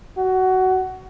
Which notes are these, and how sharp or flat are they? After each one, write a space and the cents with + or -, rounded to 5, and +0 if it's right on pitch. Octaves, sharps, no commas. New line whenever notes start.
F#4 +15